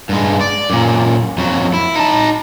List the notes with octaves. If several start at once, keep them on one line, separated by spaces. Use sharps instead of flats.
G2 G#3
D5
F#2 A#2
F2 F#3
E4
D#4 A5